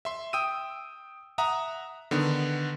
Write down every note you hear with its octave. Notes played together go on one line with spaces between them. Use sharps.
E5 C6
G5 D#6 E6 D#7
E5 F#5 A#5 D#6
D3 D#3 B3